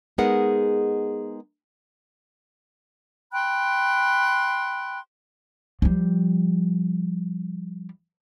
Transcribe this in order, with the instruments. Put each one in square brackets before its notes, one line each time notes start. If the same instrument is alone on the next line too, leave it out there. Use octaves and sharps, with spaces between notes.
[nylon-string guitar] G#3 B3 D#4 G#4 A#4 F#5
[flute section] G5 B5 C6 F#6
[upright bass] F3 G3